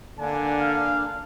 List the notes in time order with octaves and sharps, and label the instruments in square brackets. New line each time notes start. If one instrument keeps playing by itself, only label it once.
[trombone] D3 [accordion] A#3 D4 [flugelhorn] G#5
[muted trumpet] F5